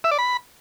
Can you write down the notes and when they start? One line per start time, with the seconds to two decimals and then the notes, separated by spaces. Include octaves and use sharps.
0.04 E5
0.11 D5
0.19 B5